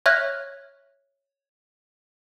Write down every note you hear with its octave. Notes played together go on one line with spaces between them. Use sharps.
C#5 E5 F6 F#6 G#6 A#6